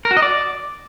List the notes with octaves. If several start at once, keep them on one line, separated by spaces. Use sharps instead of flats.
A#4
F#4
D#5
D5